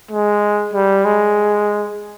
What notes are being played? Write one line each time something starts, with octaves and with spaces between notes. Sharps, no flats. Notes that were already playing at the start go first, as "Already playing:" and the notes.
G#3
G3
G#3